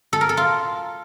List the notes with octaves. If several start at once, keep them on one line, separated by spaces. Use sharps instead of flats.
A4
A#4
A4
F4